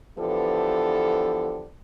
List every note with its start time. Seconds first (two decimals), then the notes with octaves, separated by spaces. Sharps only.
0.18 D3 E3 F3 B3 G4 A4